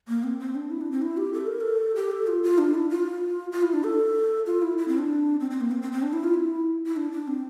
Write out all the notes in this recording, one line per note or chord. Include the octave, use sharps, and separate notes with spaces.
A#3
C4
C4
D4
E4
D4
C4
E4
G4
A4
A#4
A4
G4
A4
F4
F4
D4
E4
F4
F4
E4
D4
A4
F4
E4
E4
C4
D4
C4
C4
A#3
C4
C4
C4
D4
E4
F4
E4
E4
D4
D4
C4